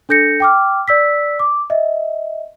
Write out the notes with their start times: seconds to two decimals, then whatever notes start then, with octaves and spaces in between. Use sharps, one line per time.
0.09 D4 A4 G6 A#6 C#7
0.40 G5 D6 F6
0.88 D5 E6 B6
1.39 D6
1.70 D#5 E5